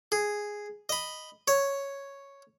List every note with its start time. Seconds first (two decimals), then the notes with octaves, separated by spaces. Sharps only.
0.12 G#4
0.89 D#5 B5
1.48 C#5